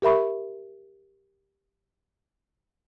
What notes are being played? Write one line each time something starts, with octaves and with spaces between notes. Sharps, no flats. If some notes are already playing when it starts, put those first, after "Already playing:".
G4 A#4 E5 B5 C#6